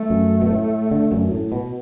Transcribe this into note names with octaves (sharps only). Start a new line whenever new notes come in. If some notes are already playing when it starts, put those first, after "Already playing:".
Already playing: A3
F#2
B2
A2
D3
F#2
A2
B2